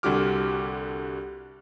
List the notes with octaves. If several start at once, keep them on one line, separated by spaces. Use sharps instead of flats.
C2 D3 F#4 G4 D6 F6